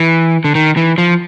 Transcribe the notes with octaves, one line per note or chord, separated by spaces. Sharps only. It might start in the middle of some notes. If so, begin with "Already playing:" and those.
Already playing: E3
D3
D#3
E3
F3